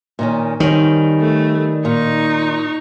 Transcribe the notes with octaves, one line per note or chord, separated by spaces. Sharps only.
A#2 D#3 C#4
D#3 G3 C4 C#4
A3
A#2 D#4 C#6